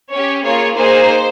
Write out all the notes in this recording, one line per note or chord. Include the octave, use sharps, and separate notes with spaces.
C#4 G4 C#5
A#3 F4 G#4 C#5
A#3 D#4 G#4 C5